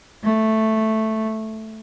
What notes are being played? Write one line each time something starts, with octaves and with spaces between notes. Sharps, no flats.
A3